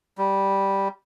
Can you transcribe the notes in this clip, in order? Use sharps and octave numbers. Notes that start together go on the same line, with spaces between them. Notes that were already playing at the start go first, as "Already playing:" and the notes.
G3